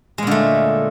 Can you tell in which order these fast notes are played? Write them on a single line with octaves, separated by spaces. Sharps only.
G#3 A#2 D3 A3